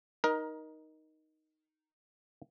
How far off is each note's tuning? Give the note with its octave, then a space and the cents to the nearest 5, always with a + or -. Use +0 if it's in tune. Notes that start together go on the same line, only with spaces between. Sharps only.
D#4 +0 A#4 +20